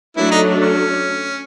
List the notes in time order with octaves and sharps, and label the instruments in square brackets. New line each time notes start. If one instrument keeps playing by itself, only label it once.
[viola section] F#3 A3 D4 [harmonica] E4
[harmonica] D#4
C#4